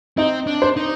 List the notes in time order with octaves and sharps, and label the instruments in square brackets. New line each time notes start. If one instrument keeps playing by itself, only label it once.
[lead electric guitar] C4 [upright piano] D#4
[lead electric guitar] D4
[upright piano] C5
[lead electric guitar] D#4